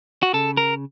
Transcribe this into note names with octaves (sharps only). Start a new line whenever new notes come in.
F#4
C#3 A4
A#4